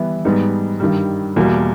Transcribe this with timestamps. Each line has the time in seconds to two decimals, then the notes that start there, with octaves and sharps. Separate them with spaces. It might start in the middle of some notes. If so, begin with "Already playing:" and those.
Already playing: E3 G3 B3 E4
0.25 G#2 G3 B3 D#4
0.80 G2 D#3 G3
1.36 E2 B2 G3 A#3